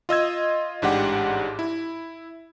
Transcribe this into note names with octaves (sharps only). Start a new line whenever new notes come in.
F4 D#5 E6 G#6
A1 G#2 D4 G4 F#5
E4